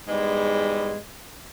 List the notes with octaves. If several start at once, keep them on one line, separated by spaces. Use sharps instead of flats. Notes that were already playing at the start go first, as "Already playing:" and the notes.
E2 G#2 G3 G#3